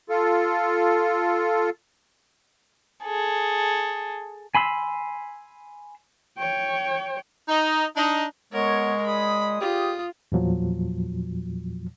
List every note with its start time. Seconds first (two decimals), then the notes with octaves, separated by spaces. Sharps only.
0.09 F4 A4
3.04 G#4 A4
4.55 G#5 B5 C6 E6
6.38 C#5 G5
7.48 D#4
7.95 D4 D#4
8.53 G#3 B3 A#4 C#5 C#6
9.06 A#2 G#4 B5 D#6
9.61 F4 G4
10.32 E2 A#2 F3 F#3